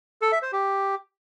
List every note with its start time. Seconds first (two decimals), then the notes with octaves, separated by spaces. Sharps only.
0.22 A4
0.32 E5
0.42 C5
0.53 G4